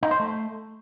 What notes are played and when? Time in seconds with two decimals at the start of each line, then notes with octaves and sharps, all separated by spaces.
0.03 D#4
0.11 C5
0.20 A3